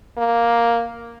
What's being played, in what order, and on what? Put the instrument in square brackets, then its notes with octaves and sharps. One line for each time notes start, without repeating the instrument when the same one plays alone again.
[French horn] A#3